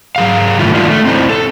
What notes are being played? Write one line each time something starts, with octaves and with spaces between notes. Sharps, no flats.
F#3 G#4 F5
A2 D#3 G#3 A3 E4 F4
F#3 G#3 A#3 D4 D#4 F4
A3
C4 D#4 E4 C5
A4